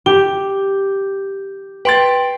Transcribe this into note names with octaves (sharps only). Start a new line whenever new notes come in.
G4 G7
B4 G5 C6 A6 D7